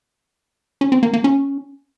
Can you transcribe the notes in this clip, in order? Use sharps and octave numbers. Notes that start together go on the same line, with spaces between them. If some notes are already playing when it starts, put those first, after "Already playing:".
C#4
C4
A#3
A#3
C#4